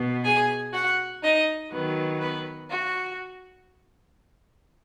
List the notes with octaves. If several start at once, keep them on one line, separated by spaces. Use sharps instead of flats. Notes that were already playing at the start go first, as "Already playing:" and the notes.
Already playing: B2 B3
G#4 G#5
F#4 F#5
D#4 D#5
D#3 F#3 B3
B3 B4
F#4